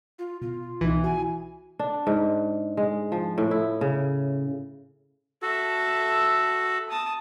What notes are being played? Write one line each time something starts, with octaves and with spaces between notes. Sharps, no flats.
F4
B2 F4
C2 B2 E3 D#4
F#4 G#5
D4
G#2
G#3
F3
A2
E4
C#3
F#4 A4 E5 A5
A5 D#6